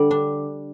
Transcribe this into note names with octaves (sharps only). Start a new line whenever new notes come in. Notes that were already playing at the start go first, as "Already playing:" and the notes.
Already playing: D3 G3 D5
D4